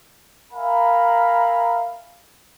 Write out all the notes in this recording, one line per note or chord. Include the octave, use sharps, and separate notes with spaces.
A#4 E5 F5 G#5 A#5 B5